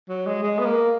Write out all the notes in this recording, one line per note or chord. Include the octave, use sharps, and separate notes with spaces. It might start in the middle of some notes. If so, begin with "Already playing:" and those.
F#3
G#3
G#3
B3
A#3